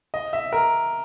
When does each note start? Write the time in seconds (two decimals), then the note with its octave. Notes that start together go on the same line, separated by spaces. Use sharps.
0.14 D#5
0.33 E5
0.53 A#4